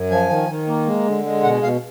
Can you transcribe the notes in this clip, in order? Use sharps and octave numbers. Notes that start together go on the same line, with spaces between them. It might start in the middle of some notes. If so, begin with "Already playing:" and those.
Already playing: F#2
F3 G#5
D#3
D#3
A#3
G#3
D3
G#3
B2 F#5
B2 F5